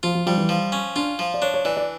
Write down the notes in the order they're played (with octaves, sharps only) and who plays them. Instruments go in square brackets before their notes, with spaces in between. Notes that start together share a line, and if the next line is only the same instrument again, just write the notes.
[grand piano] F3 [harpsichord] F4
[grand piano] F3
[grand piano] F3 [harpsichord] G3
[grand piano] E3
[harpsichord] F3
C#4
[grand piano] D4 [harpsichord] F4
[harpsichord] F3
[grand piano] D5
[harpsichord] D4 [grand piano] C#5
[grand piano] C#5
[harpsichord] E3 [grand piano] D5
[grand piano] D5